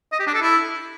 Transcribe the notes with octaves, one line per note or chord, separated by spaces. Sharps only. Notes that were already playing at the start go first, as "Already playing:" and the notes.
D#5
G4
D4
A4
E4